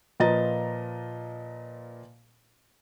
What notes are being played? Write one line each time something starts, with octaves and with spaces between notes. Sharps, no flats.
A#2 F3 B4 D#5 A#5 A6